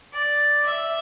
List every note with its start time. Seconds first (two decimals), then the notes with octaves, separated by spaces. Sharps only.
0.13 D5
0.65 E5